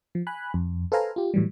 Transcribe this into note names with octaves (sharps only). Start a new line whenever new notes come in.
F3
G#5 B5 F#6
F2
A4 B4 C5 F5 G#5 A#5
F4 G4
A2 E3 F#3 G3